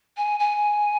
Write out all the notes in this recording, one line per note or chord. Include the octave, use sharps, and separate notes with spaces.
G#5
G#5